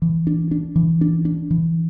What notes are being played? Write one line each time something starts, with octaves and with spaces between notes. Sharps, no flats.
E3
D4
D4
E3
D4
D4
E3